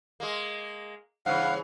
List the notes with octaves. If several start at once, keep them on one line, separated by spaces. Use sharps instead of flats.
G#3 A#3
G2 C#3 E3 F5 F#5